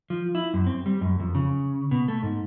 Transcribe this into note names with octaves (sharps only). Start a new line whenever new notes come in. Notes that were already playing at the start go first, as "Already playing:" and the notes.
F3
E4
F#2
C4
G3
F#2
F2
C#3
B2
A3
G#2